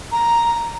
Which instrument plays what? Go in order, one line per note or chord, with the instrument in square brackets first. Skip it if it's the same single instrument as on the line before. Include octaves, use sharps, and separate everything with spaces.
[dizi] A#5